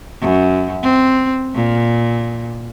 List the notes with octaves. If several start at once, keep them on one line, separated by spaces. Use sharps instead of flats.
F#2
C4
A#2